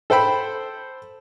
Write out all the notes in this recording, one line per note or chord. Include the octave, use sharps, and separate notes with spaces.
A4 C5 G5 B5